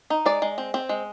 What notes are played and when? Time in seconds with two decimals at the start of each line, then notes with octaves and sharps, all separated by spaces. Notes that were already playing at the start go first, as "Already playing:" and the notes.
0.10 D#4
0.26 G#3 D5
0.42 G#3
0.58 C4
0.74 C4
0.89 G#3